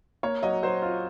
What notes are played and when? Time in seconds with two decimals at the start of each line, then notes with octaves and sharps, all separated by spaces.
0.23 A#3 C#5
0.43 F#3 D#5
0.63 F#3 C5
0.82 F4